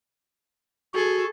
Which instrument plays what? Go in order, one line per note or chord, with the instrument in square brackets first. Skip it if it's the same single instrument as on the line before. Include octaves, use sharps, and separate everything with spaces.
[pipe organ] F#4 [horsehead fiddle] G#4 A4